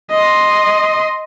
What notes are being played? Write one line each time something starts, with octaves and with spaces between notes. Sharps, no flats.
D#5 C6